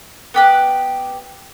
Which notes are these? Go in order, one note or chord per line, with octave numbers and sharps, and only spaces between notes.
B3 G4 F#6